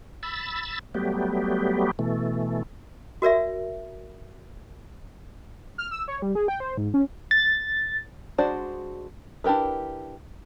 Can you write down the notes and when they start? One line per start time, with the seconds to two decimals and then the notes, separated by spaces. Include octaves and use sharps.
0.23 B5 E6 A6
0.95 F#3 G3 A3 B3 G4
1.99 B2 E3 A3
3.22 F#4 A#4 D5 E5
5.78 F6
5.91 E6
6.08 C#5
6.22 G3
6.35 G#4
6.48 G5
6.60 C5
6.78 G#2
6.94 C#4
7.31 A6
8.38 G#3 D4 F#4 C5 D5
9.44 D4 E4 G4 A#4 B4